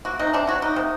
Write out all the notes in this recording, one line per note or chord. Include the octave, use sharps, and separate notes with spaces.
A#3 F#4
C3 D#4
C3 D4
F#3 F#4
A#3 D#4
C3